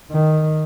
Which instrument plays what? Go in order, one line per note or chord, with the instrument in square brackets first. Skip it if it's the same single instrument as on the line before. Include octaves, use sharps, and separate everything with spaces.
[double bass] D#3